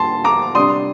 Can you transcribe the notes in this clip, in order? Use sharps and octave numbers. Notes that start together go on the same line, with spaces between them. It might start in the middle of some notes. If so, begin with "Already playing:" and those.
Already playing: D3 G3 A#3 A5 C6
A#5 D6
C3 G3 D4 C6 D#6